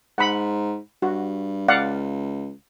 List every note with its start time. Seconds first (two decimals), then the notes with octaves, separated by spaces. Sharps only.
0.18 G#2 F#5 B5
1.02 G2 F#4
1.68 C#2 D5 F5 F#5